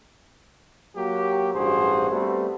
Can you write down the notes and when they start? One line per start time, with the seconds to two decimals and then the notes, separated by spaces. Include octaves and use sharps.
0.97 F#3 A#3 F#4 G4
1.55 A1 G2 F#4 G#4 C5
2.11 G3 A3 B3 C4 F#4